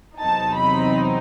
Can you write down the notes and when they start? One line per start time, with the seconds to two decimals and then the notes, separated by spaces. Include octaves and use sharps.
0.19 E2 C3 F#3 C4 D#4 A5
0.58 B5